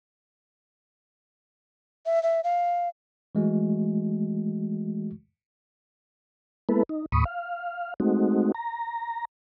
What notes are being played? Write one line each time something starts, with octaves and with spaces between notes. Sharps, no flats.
E5
E5
F5
E3 G#3 A3 F#4
G#3 A#3 B3 E4 A4 B4
D#4
D#2 A2 B5 C#6 D#6
F5
G#3 A3 C4 D#4 F#4
A#5